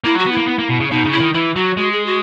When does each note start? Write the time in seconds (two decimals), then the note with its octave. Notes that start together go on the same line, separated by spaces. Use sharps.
0.04 A#3 E4
0.15 F#3
0.19 F#4
0.26 B3
0.32 E4
0.37 A#3
0.47 B3
0.59 A#3
0.69 B2
0.80 C#3
0.90 B2 D#4
1.05 C#3
1.12 E4
1.20 D#3
1.34 E3 E4
1.56 F#3 F#4
1.77 G#3 F#4
1.92 G#4
2.06 F#4